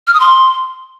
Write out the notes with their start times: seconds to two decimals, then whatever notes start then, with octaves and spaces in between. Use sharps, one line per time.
0.07 F6
0.14 D#6
0.20 C6